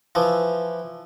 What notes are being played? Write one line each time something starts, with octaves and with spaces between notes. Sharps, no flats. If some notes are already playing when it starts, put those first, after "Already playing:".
E3 F3